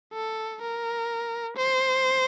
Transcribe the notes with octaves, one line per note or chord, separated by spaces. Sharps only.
A4
A#4
C5